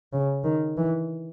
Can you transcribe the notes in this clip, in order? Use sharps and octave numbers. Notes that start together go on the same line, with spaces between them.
C#3
D#3
E3